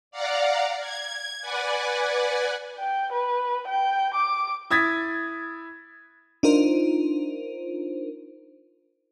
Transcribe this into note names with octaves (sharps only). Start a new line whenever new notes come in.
D5 F5 F#5 A#5
G#6
B4 D5 F#5 G#5
G5
B4
G5
D6
E4 D#6 G#6 A6 B6
D4 D#4 F4 A#4 C5